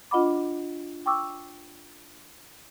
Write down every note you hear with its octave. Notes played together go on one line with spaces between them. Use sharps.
D4 F4 D#5 F#5 B5 D6
G5 C#6 D6 E6